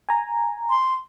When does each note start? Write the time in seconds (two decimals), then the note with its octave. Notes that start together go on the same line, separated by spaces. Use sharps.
0.09 G#5 A#5
0.70 C6